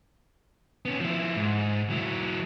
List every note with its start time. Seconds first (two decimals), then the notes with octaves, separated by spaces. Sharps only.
0.85 B3 C#4
1.00 F3 E4
1.37 G#2
1.90 F#3 E4